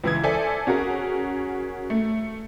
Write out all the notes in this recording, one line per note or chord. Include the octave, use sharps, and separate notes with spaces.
C#2 E3 E4 D#6 G#6
A4 C5 D5 E5 G#5
C#4 F#4 G#4 A#4
A3